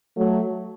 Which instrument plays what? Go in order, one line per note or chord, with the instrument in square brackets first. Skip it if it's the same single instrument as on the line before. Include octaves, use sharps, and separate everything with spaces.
[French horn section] F#3 A3